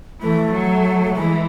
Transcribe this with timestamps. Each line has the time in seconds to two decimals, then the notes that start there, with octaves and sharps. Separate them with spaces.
0.21 E3 A3
0.53 F#3
1.14 E3 G#3